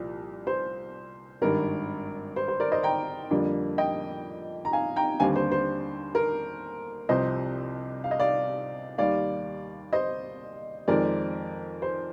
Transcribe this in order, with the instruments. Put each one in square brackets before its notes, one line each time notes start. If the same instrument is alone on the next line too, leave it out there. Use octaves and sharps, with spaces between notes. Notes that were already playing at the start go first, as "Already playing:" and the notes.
Already playing: [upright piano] C2 A#2 F3
C5
G#1 G2 D#3 A#4
C5
C5
A#4 D5
C5 D#5
G5 A#5
F2 D3 G3 A#3 D4
D#5 G5
A#5
F5 G#5
G5 A#5
D#2 D3 G3 C4 F5 G#5
C5
C5
A#4
C2 C3 F3 C5 D#5
F5
D#5
D5 F5
D#2 D#3 G3 D5 F5
C5 D#5
F2 D#3 G#3 C4 A#4 D5
C5